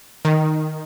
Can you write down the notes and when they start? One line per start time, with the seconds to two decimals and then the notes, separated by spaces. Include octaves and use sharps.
0.25 D#3